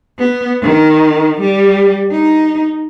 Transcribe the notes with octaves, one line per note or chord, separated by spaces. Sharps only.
B3
D#3
G3
D#4